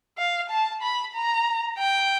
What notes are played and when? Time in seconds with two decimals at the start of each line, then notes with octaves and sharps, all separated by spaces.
0.18 F5
0.50 A5
0.83 B5
1.14 A#5
1.78 G5